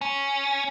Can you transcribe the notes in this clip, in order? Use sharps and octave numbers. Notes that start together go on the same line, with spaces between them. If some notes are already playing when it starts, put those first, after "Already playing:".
C#4